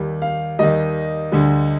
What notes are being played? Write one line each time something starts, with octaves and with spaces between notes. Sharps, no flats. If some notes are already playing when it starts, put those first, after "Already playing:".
Already playing: D#2 D#3 G3
F5
D#2 D#3 G3 D#5
D2 D3 G3